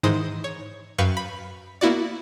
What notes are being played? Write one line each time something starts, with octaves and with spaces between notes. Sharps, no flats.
G#2 D#3 E3 G#3 C5 D#6
C#5
F#2 B4 F5 G5 C#6 C#7
B5
A#3 B3 E4 F#4 D5